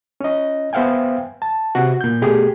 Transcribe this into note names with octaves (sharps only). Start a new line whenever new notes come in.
C#4 D#5
B3 C5 E5 F5 G5 G#5
A5
C3 F#4
A#2 G6
B2 A3 G4 G#4